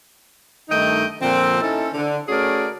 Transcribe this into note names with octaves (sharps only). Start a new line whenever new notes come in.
G2 D#3 A3 D#4 D#5 G5
A#2 D3 F3 C4
C#4 D#4 E4 A4
D3
A3 C#4 F#4 G#4 A#4 D5